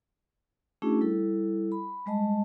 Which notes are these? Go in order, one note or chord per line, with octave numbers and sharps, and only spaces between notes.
A3 C#4 D4 E4 F#4 G#4
G3 E4 A4
B5
G3 G#3 D#5 A5